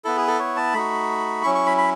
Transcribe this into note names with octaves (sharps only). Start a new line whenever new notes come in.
B3 E4 A4
G#4
A4
C#5
A5
A3 D#4 F#4 B5
F#3 C#4 E4 C#6
C#6
B5
B5